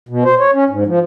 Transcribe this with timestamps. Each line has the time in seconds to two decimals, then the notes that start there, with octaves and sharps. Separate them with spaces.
0.09 B2
0.24 C5
0.39 C#5
0.54 C#4
0.70 G#2
0.87 F3